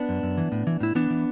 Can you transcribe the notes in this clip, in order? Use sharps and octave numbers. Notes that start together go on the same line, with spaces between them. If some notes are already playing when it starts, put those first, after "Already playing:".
Already playing: B3 D4
F#2
F#2
E3
A2
E3
A2 E4
E3 B3 D4
E3